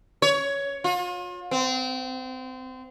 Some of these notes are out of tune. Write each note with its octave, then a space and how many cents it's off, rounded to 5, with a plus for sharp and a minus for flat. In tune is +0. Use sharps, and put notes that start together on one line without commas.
C#5 +15
F4 +40
C4 -25